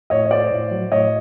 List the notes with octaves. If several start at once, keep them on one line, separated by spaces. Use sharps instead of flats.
A2 C#5 D#5
C#5
A3 C5 D5
A2
F#3
A2 C#5 D#5